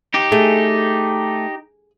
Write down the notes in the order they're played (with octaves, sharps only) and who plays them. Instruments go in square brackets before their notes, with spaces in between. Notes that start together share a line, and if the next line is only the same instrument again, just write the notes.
[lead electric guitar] D#4 G4
[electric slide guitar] A3 [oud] G#4